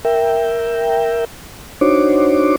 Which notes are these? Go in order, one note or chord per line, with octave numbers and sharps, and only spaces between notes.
A#4 E5 G5
D4 D#4 F#4 C5 C#5 D6